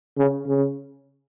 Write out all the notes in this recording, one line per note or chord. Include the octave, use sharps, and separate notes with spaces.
C#3
C#3